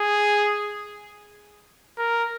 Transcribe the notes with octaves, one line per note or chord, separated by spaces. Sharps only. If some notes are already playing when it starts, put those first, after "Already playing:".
Already playing: G#4
A#4